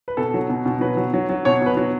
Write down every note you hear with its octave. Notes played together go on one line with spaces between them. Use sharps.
B4
B2 A4
F#3
B2
B2
F#3 B4
F#3
F#3
F#3
B2 C#5
B2 B4
F#3